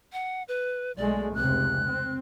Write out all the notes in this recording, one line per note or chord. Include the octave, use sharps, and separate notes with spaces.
F#5
B4
B1 G#3 A3 D5
F1 C#2 C3 F#6
C4